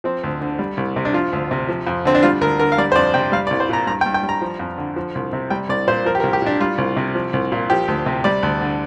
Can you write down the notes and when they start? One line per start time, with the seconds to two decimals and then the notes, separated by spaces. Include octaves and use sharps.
0.04 F3 C4
0.23 D2
0.41 D3
0.59 G3
0.77 C2
0.96 C3
1.05 D4
1.13 F3 F4
1.33 D2
1.51 C3
1.69 F3
1.87 F2
2.05 D3 C4
2.15 D4
2.23 G3 F4
2.41 D2 A#4
2.59 D3 A#4
2.72 F5
2.78 G3 D5
2.92 C5
2.96 F2 D5
3.14 C3 G5
3.32 G3 F5
3.47 D5
3.51 C2
3.60 C5
3.69 A#2 A#5
3.87 G2 A#5
4.01 G5
4.06 G2
4.14 G5
4.23 G3
4.29 A#5
4.42 F3
4.59 F2
4.78 D3
4.96 F3
5.15 C2
5.33 C3
5.50 G3 G5
5.69 C2 D5
5.88 A#2 C5
6.05 F3 A#4
6.15 G4
6.20 A#4
6.23 C2
6.33 G4
6.42 A#2 D4
6.61 G3 F4
6.78 C2
6.97 C3
7.15 F3
7.33 C2
7.52 A#2
7.70 F3 G4
7.88 D2
8.06 C3
8.24 G3 D5
8.43 D2
8.61 D3